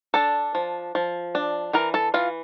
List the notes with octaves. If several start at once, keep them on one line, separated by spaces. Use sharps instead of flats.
D4 A4 A5
F3
F3
D4
E3 A#4 A#5
A4 A5
E3 F4 F5